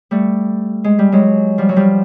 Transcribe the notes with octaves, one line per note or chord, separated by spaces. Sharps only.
G3 A3
G#3
G3
F#3 G#3
F3 G3
F#3
F3 G3